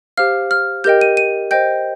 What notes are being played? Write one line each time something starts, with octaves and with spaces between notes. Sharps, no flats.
G4 C5 F5 F6
F6
G4 A#4 D#5 G5 G6
D#7
D#7
C5 D#5 G5 G6